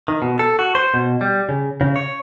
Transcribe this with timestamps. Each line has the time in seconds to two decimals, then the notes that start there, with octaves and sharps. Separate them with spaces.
0.08 D#3
0.22 B2
0.39 A4
0.59 F#4
0.75 C5
0.94 B2
1.21 G3
1.49 C#3
1.81 C#3
1.96 C#5